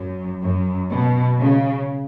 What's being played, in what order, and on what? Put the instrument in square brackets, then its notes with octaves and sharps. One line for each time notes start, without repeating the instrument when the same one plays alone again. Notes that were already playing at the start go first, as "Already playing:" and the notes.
Already playing: [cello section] F#2
F#2
B2
C#3